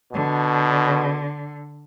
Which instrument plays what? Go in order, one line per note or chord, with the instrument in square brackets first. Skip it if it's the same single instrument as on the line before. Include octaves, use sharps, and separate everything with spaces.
[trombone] B2 [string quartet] D3